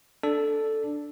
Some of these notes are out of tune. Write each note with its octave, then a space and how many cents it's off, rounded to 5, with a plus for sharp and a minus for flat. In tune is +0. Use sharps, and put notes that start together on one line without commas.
D4 +0 A4 +0 D5 +0